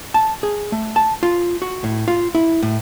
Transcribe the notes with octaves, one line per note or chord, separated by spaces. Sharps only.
A5
G#4
A3
A5
F4
F#4
A2
F4
E4
A2